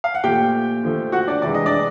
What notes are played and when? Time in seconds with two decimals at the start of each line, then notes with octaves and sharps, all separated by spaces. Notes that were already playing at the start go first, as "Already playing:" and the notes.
0.04 F5
0.15 F#5
0.24 A#2 F3 A3 G4 G5
0.83 D3 F3 A3
1.12 F#4 F#5
1.28 D4 D5
1.42 C3 E3 G#3 D5
1.54 D#5
1.66 D4 D5